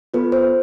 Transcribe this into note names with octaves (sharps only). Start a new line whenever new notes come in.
B3 F4 A4 B4
C5